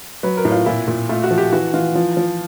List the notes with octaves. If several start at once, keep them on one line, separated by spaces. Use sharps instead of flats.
F#3 B4
A#4
A2
F4
A#2 E4
A#2
A3 F4
F#4
F3
G4
E3 F#4
E3 F4
F3
F3